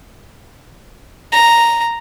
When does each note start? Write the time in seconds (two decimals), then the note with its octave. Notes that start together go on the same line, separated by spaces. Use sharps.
1.32 A#5